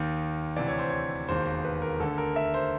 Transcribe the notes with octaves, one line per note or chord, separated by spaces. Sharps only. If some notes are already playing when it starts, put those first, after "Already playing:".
Already playing: D#2 D#3
D2 C3 E3 D5
C#5
C5
C#5
E1 D#2 D#3 C5
C5
B4
A#4
D2 D3 A4
A#4
E5
C5